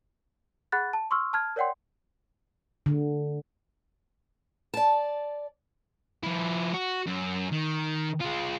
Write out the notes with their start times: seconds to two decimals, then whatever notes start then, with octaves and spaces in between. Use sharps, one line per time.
0.72 G#4 F#5 B5 F#6 A6
0.93 A5
1.11 C6 C#6 E6 F6
1.33 A5 F6 G#6
1.56 A#4 C#5 D5 F#5 G5 C6
2.86 D3
4.74 D5 A5
6.23 F3 E4
6.74 F#4
7.07 F#2
7.52 D#3
8.21 G#3 F4